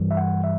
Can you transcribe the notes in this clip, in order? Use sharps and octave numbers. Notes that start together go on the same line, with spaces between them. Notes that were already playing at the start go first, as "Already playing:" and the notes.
Already playing: G2 E3 G3
E5
F#5
E5